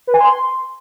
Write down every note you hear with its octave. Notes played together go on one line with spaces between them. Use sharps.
B4
G#5
C6